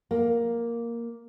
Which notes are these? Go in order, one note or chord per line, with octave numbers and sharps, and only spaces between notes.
A#3